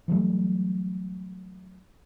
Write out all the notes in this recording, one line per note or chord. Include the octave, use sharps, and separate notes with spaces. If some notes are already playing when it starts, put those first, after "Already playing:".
E3 F#3 G3 A3